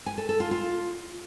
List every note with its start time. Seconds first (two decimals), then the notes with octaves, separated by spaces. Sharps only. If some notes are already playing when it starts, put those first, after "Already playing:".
0.06 G#5
0.18 A4
0.29 A4
0.40 F4
0.51 F4